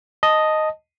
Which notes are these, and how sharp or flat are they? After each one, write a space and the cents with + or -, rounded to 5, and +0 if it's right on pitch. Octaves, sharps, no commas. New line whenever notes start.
D#5 +0 A5 +0